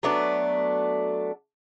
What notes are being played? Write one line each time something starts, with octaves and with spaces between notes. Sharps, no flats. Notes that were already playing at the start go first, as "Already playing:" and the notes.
F#3 A3 B3 D4